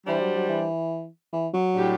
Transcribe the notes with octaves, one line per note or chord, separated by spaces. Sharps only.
E3 G3 D4 G4 C5
F#3
F#3
E3
E3
F#3
A2 G3 D4 G4